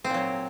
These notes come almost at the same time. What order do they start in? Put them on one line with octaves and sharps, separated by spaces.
C4 A#2 F#3